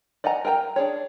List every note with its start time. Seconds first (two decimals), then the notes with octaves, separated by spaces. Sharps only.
0.24 D5 D#5 F#5 G#5 A#5
0.45 A#4 F5 G5 G#5 A#5
0.76 D4 G#4 C#5